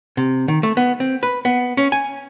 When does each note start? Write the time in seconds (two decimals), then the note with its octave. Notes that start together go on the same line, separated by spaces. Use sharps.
0.17 C3
0.48 D#3
0.63 A3
0.77 B3
1.00 C4
1.23 B4
1.45 B3
1.77 C#4
1.92 G#5